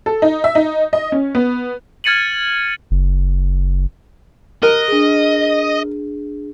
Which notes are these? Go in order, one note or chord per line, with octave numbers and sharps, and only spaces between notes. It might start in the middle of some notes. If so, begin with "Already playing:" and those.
A4
D#4
E5
D#4
D#5
C#4
B3
F6 G#6 A6 C#7 D#7 F#7
F#1
A#4 D#5 F#6
D4 G#4